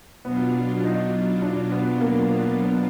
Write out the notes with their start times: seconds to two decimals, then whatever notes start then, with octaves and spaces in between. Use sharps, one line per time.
0.24 B2 F#3 B3 D4 F4
0.84 D#4
1.42 D4
1.72 B3
2.01 A#3
2.30 B3
2.60 B3